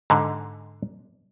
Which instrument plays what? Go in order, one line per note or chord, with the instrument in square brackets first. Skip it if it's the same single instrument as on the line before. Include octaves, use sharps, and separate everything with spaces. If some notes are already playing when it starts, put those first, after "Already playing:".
[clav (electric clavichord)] G#2 D3